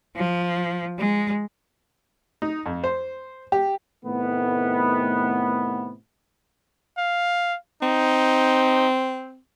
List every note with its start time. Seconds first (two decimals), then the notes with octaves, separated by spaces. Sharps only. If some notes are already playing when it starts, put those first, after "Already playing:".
0.16 F3
0.98 G#3
2.42 D#4
2.66 F2
2.84 C5
3.52 G4
4.06 A2 C3 D#3 A3 B3
6.98 F5
7.82 C4 D#4